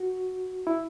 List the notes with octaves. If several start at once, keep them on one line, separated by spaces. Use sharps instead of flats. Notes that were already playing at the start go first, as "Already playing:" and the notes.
Already playing: F#4
E4